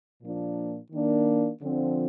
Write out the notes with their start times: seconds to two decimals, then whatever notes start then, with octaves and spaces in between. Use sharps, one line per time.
0.22 A#2 F3 A#3 D4
0.92 D#3 A#3 D4
1.62 D3 F3 C4